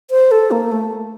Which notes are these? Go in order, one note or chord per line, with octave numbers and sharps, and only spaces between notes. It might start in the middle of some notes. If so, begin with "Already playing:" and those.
C5
A4
A#3
A3